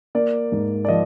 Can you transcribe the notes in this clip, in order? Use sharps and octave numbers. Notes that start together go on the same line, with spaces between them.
A#3 D5
G#2
D5
F3 D#5